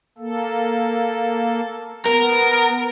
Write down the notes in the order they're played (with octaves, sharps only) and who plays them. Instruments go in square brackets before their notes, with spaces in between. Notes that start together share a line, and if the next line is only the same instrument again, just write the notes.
[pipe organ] A#3 A4
[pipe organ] B3 [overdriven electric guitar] A#4